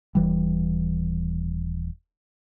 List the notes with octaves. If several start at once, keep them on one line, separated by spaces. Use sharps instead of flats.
D#1 E3 G3